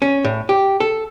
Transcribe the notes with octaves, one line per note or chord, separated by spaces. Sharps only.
C#4
A2
G4
A4